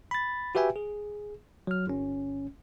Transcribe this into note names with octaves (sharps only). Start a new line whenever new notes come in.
B5 A6
F#4 G4 B4 E5 G5 G#5
G#4
F#3 F6
G1 C#4